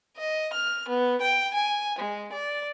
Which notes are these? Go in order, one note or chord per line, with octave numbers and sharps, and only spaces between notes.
D#5
F6
B3
G5
G#5
G#3
D5